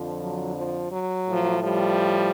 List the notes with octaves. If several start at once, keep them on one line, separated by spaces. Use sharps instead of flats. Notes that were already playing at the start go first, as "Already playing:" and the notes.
Already playing: F2 D3 F3
F#3
F3
F#3
A2 F3
F3 G3